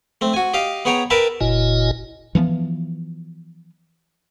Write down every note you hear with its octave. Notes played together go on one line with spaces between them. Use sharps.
A3 C4
F#4 G#5
G4 D#5 F5
B3 G#4 C#5 G5 A#5
A#4 B4 E5 G5 A5
F#1 A#2 E4 F#4 D#5 G#5
E3 F3 A3 B3